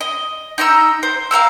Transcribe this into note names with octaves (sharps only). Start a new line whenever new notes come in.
D#5
D#4 D#5 A#5 E6
C5
F5 F#5 A#5 E6